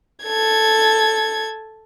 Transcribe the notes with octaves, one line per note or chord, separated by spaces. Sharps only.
A4 G#6